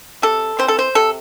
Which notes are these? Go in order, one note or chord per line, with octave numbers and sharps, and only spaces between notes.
C3 A4
E3 C4 C5
A4
C5
C3 A4